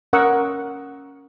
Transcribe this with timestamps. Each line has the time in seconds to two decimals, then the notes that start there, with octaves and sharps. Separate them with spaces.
0.13 C#4 A#4 F#5 C#6 D#6 E6